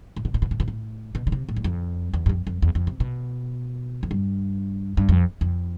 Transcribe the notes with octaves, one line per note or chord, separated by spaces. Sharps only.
A2
B2
A2
B2
A2
B2
A2
B2
D3
C3
A2
E2
F2
E2
G2
F2
F2
E2
F2
C3
B2
F2
G2
G2
F2
F2